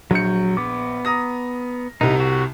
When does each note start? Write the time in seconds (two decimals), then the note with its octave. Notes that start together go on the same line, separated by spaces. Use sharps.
0.11 A#1 F#3 G6 C#7
0.57 B3 D6
1.05 A#5 D#6 A#6
2.01 C2 C3 D#4
2.20 F#4